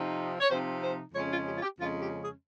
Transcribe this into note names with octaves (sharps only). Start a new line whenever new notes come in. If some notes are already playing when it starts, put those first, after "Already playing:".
Already playing: C3 F3 C4 D#4
C#5
C3 F3 C4 D#4 C5
C5
F2 C#3 G#3 C#4 C#5
F4
G4
F4
G4
F2 C#3 G#3 C#4 F4
G4
G#4